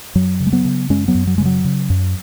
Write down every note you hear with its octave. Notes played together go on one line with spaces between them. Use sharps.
F#2 F#3
C#3
G#3
F#3 B3
C#3
F#2 G#3 C#4
F#3 B3
F#2
F#3
C#3 G#3
F#3
C#3
F#2